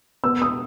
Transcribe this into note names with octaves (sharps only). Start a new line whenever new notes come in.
B3 E6
D#6